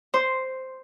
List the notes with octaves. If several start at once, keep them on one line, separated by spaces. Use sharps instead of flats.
C5